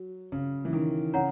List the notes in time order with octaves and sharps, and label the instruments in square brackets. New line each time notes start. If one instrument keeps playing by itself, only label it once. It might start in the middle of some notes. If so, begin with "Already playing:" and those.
Already playing: [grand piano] F#3
C#3
E3
D#3
[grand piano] C#3 [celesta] C#5 F#5 A#5